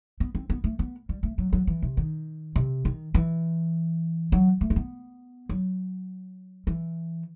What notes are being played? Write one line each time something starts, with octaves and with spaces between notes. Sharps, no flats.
B3
C4
B3
A3
B3
G3
A3
F#3
F#3
E3
C3
D#3
C3
D#3
E3
F#3
A3
C4
B3
F#3
E3